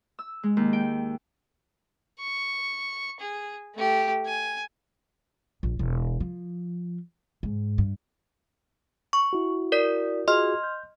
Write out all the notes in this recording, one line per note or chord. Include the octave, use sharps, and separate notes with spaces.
E6
G#3
D#2
G5
C#6
G#4
A3 G4
G#5
A#1
E1
F3
G#2
G2
C#6
E4 F#4
A#4 D5 B6
F4 F#4 G#4 D#5 C6 F6
G6